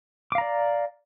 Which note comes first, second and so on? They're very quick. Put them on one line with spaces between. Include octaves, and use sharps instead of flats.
D6 F5 A#5 D5